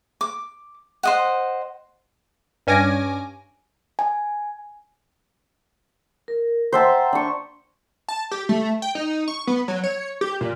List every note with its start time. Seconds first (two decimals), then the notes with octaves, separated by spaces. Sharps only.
0.21 D6
1.03 C5 D#5 F#5
2.67 G2 C#4 G#5 D6 A#6 D7
3.99 G#5
6.28 A#4
6.73 C5 E5 F#5 G5 A5 A#5
7.13 D4 C#6
8.09 A5
8.31 G4
8.49 A3
8.82 G5
8.95 D#4
9.28 C#6
9.47 B3
9.68 F#3
9.84 C#5
10.21 G4
10.41 A#2